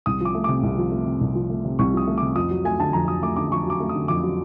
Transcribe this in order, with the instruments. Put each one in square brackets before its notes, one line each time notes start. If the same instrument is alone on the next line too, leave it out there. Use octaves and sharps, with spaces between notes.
[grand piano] C2 D#6
F3 D6
A3
C3 D6
C2
F3
A3
C3
C2
F3
A3
C3
C2 C#6
F3 D#6
A3
D6
C3
F2 D#6
F#3
A3 G#5
D3 A5
F2 A#5
F#3 D#6
A3 D6
D3 D6
F2 C#6
F#3 D6
A3
D#6
D3
F2 D6
F#3